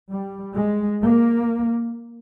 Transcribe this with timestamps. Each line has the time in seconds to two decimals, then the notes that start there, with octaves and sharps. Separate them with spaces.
0.10 G3
0.55 G#3
1.01 A#3